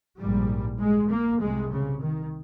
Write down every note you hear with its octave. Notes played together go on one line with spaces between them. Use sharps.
A#1 G#2 G3
G#3
A#3
C2 C3 G#3
C#3
D#3